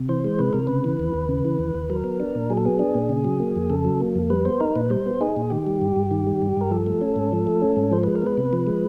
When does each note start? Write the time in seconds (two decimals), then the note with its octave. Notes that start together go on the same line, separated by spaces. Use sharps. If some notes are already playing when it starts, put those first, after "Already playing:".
Already playing: C3
0.09 E3 C5
0.24 G#3
0.39 C3 B4
0.53 C3 A#4
0.67 C#3 B4
0.84 E3
1.00 D#2
1.14 D#2
1.29 C#3
1.45 E3
1.59 D#2
1.75 D#2
1.90 F#3 A#4
2.04 B3
2.20 D4
2.35 A#2
2.50 F#3 G#4
2.57 A4
2.65 B3 G#4
2.79 D4
2.95 A#2
3.09 C#3
3.24 F#3
3.40 A#3
3.56 F2
3.70 C#3 A4
3.85 F#3
4.00 A#3
4.16 F2
4.30 G3 B4
4.45 B3 C5
4.60 D#4 A#4
4.75 A#2 B4
4.90 G3 C5
5.06 B3
5.21 D#4 G#4
5.36 A#2
5.50 D#3 G4
5.67 G3
5.81 G2
5.96 G2
6.11 D#3
6.27 G3
6.42 G2
6.57 G2 A#4
6.71 F3 A4
6.86 A3
7.01 C#4
7.16 G#2
7.32 F3
7.47 A3
7.62 C#4
7.76 G#2
7.91 F3 C5
8.03 G#3 B4
8.15 A#4
8.22 B3 B4
8.37 C3
8.53 F3
8.67 G#3